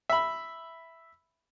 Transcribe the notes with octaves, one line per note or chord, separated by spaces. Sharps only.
E5 B5